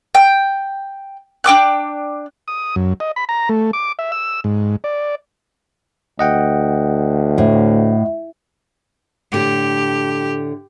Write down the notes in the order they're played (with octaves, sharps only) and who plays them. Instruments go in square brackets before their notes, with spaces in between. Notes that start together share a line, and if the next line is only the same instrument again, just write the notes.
[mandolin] G5
D4 G5 D6 F#6
[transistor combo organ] D#6
F#2
D#5
B5
A#5
A3
D6
E5
E6
G#2
D5
[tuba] D2 [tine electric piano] D#5 F#5 G5
[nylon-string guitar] A2
[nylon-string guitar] A2 D3 [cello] G4